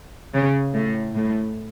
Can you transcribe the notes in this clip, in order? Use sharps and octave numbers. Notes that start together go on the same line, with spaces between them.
C#3
A2
A2